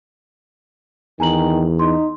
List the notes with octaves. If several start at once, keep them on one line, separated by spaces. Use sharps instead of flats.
E2 D#3 G#5 A#5 F#7
D#4 C6